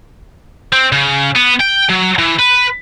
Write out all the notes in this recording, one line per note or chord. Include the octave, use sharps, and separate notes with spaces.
C4
C#3
B3
G5
F#3
E3
B4